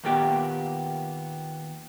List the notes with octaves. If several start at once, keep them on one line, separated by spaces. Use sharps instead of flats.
D#2 A#2 A#3 B3 G4